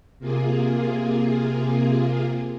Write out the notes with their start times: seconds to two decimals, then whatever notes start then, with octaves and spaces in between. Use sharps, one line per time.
0.19 C3 A#3 F4 G#4